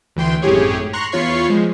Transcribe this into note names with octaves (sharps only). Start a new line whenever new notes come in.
D2 E3 G5 C6
G#1 F#2 A2 G4 G#4 C#5
A#5 C6 C#6 F#6
E2 F4 C#5 B5 C#6 C7
F3 G#3